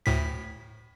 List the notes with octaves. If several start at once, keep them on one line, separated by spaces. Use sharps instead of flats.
D2 A2 B6